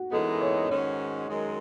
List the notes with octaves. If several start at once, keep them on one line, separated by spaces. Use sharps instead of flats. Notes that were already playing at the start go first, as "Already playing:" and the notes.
Already playing: F#4
F#2 E3 G#3 B3 D#4 A4
C#5
G#2 D#3 G#3 C#4 F#4 C#5
F#2 D#3 G#3